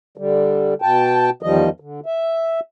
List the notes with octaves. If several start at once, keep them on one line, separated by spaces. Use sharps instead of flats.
D3 G3
B2 G5 A5
E2 D#3 F3 G3 D#5
D3
E5